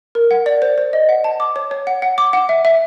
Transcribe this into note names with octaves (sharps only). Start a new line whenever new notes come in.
A#4
F#5
D5
C5
C5
D#5
F#5
A5
D6
C#5
C#5
F#5
F#5
D6
F#5
E5
E5